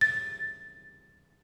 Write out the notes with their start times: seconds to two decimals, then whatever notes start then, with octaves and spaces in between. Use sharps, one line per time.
0.01 A6